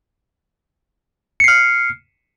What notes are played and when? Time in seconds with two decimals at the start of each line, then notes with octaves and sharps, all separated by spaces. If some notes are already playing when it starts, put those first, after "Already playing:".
1.40 C#7
1.44 C7
1.48 F6